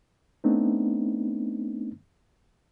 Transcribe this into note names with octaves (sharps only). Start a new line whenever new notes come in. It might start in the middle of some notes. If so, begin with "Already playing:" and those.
A3 B3 C4 D4 D#4